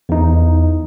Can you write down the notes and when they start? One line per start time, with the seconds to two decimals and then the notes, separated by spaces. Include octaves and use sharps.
0.09 E2 D#4